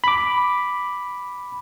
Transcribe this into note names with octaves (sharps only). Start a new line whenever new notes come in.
B5 D6